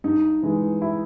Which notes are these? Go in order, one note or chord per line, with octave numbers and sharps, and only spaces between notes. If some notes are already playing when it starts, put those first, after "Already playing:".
G2 D#4
E3 G#3
E4